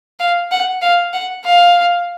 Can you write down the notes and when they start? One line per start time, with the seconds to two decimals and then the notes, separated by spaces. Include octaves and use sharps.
0.20 F5
0.51 F#5
0.82 F5
1.13 F#5
1.45 F5